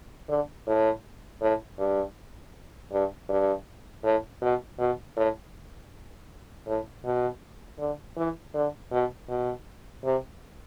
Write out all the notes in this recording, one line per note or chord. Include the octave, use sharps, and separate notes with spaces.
D3
A2
A2
G2
G2
G2
A2
B2
B2
A2
A2
B2
D3
E3
D3
B2
B2
C3